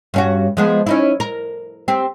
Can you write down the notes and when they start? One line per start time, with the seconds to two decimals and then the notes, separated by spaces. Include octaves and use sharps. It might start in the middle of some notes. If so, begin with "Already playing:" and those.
0.14 G2 C#4 F#4
0.57 F3 G#3 B3
0.86 C#4 D#4 E4
1.20 A#4
1.88 C4 G4